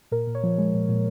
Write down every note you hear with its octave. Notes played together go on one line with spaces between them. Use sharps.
A#2 A#4
A#2
C#5
F3
G#3
A#2
A#2